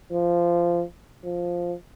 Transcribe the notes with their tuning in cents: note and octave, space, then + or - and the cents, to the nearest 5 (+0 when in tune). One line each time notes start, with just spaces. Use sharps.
F3 -15
F3 +0